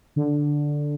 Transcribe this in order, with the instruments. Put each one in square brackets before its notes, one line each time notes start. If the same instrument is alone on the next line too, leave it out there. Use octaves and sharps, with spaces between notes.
[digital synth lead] D3